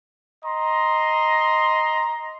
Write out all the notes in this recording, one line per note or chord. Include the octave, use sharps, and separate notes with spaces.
D#5 A#5 C6